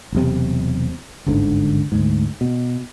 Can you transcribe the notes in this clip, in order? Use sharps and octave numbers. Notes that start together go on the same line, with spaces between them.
E1 B1 C3
G1 C#2 G#2 D3
D2 G#2
B2